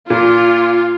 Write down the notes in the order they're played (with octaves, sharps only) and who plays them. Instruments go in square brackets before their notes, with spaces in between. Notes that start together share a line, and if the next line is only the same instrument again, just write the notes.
[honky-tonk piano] A#2 [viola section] F4